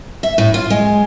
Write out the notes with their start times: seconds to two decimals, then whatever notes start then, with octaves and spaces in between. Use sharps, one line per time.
0.23 E5
0.38 A2
0.54 F4
0.70 G#3